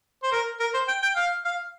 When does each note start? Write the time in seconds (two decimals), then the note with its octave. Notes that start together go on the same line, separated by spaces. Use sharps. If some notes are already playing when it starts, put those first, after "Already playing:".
0.23 C5
0.32 A#4
0.60 A#4
0.74 C5
0.88 G5
1.02 G5
1.16 F5
1.45 F5